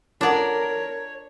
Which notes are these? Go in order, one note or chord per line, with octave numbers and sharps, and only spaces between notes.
D4 F4 A4 A#4 C#5 D5 F#5